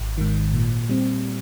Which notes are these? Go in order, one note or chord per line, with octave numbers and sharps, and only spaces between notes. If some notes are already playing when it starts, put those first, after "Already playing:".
Already playing: G#1
G#2 D#3
A#2
G3 C4